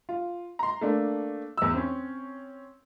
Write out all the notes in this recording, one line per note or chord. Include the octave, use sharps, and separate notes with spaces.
F4
A#5 C6
A3 A#3 D4
E2 E6
C4 C#4